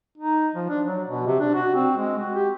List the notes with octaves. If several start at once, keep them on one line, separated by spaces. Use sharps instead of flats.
D#4
F3
D4
F#3
B2
C3
D4
F#4
C4
G#3
F#4
G4